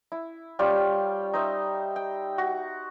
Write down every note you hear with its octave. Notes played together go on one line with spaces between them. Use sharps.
E4
G3 C#4 F4 G5
D#4 C5 E5
G5
F#4